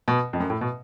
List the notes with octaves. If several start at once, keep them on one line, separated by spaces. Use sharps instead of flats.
B2
F2
F#2
A2
B2